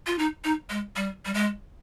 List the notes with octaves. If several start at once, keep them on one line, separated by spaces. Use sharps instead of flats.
F4
D#4
D#4
G#3
G3
G3
G#3